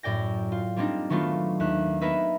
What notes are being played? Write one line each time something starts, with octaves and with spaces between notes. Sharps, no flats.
F#2 A2 D5 G5 A#6
F4
G3 A#3 C4 D4 D#4
D#3 F#3 A3 B3 D4 F4
D#2 E5 F#6
A#3 B3 D#4 A#4 B4 E5